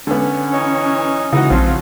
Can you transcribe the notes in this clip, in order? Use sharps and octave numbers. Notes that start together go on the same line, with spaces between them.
D3 B3 C#4
E3 D#4 C#5
C#3 E3 D#4 F#4
A#1 F2 F3 F#3 F4